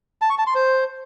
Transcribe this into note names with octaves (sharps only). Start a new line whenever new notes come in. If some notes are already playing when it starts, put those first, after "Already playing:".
A5
C#6
A5
C6
C5